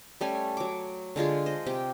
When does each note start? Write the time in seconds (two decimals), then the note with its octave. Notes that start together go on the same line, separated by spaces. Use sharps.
0.21 G3 A3 C#4 G#5
0.57 F#3 D6
1.16 D3 G#3 F4 G#4
1.46 C5 D#5
1.66 C3 G4 G5